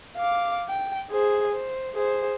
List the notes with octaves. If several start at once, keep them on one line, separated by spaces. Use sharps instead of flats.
F5 D6
G5
G#4 C5
C5
G#4 C5